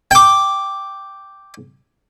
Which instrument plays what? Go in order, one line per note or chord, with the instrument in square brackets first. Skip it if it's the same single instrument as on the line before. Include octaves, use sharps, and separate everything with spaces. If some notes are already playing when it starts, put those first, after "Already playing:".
[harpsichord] G5 D6